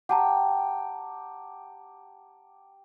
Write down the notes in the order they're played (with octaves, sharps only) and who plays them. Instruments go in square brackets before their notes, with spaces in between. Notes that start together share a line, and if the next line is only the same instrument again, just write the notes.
[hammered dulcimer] G4 [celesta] F#5 A5 A#5